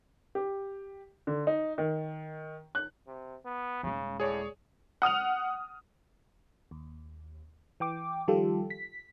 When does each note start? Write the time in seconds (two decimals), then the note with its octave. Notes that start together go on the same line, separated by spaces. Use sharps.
0.35 G4
1.27 D3
1.47 D#4
1.78 D#3
2.75 F#6
3.07 C3
3.45 B3
3.83 D#1 C#3 G#3
4.20 A2 G#4 C#5 D5
5.02 F#5 D#6 F6 F7
6.71 D#2
7.80 E3 G5 D6
8.28 D#3 F3 G3 F4 G4 A4
8.70 B6